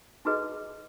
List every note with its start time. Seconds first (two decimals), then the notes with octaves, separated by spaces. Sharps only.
0.25 D#4 E4 F#4 G#4 B4 D#5